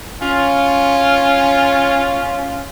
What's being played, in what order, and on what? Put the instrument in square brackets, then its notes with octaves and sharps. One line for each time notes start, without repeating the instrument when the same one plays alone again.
[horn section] C#4 F4